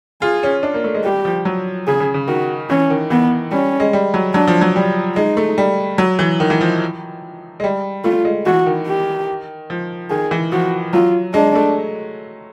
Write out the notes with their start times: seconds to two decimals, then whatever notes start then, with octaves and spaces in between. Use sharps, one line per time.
0.22 F4 G#4
0.43 C#4
0.63 D4
0.74 A#3
0.84 A3
0.94 G#3
1.04 G3 G4
1.25 F3
1.45 F#3
1.87 C#3 G#4
2.00 C#3
2.14 C#3
2.27 D#3 F#4
2.70 E3 C#4
2.90 D#3
3.10 E3 B3
3.51 G3 C#4
3.80 G#3
3.93 G3
4.14 F#3
4.34 F#3 D4
4.47 F3
4.61 F#3
4.76 G3
5.16 G#3 D#4
5.37 A3
5.58 G3
5.98 F#3
6.19 E3
6.40 D#3
6.50 E3
6.61 F3
7.60 G#3
7.64 G3
8.04 A3 F4
8.25 G#3
8.46 E3 F#4
8.66 D#3
8.87 G4
9.70 F3
10.10 D#3 G#4
10.31 E3
10.52 F3 F#4
10.93 F#3 F4
11.34 G#3 D4
11.55 A3